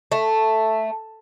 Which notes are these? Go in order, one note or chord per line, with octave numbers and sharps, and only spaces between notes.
A3